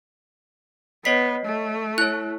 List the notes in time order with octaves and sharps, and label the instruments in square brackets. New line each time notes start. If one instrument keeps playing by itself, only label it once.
[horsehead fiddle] B3 [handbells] C#5 D#5 C7 [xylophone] B6
[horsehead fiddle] A3
[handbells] E4 C#5 [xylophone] F#6